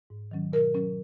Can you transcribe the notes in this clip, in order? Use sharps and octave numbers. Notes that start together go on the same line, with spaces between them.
G#2
D#3 F#3 C#4
B2 A#4
F#3 C#4